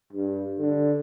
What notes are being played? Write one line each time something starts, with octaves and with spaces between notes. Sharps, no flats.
G2
D3